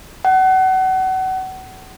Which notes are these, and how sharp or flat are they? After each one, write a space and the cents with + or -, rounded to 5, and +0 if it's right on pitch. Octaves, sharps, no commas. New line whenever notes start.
F#5 +30